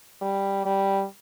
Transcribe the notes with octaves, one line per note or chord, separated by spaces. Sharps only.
G3
G3